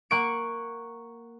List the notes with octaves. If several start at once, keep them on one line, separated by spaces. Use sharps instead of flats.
A#3 F#5 C#6 D7